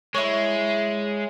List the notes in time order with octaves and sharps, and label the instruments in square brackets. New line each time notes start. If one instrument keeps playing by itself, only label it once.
[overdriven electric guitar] G#3 [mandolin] E4 C#5